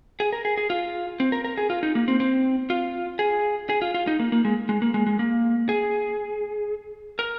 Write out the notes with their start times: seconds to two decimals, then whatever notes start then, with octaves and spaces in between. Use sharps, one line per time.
0.20 G#4
0.33 A#4
0.45 G#4
0.57 G#4
0.70 F4
1.20 C4
1.32 A#4
1.45 A#4
1.58 G#4
1.70 F4
1.83 D#4
1.95 A#3
2.08 C4
2.20 C4
2.70 F4
3.19 G#4
3.69 G#4
3.82 F4
3.94 F4
4.07 D#4
4.19 A#3
4.32 A#3
4.45 G#3
4.69 G#3
4.82 A#3
4.94 G#3
5.07 G#3
5.19 A#3
5.69 G#4
7.19 A#4